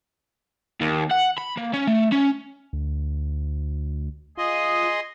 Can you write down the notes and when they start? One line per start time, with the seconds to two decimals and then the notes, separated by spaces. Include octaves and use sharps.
0.81 D#2
1.11 F#5
1.38 B5
1.57 A#3
1.74 C#4
1.88 A3
2.12 C#4
2.73 D2
4.37 F4 G#4 D#5 C6